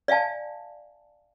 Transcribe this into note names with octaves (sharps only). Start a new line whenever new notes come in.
D5 E5 F5 G#5 A5